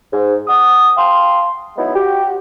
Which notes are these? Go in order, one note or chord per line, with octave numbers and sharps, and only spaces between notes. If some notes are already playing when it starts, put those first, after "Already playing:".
G#2
F#5 D#6
F5 G5 A5 C6
F#3 G#3 B3 D#4 E4
F#4 G4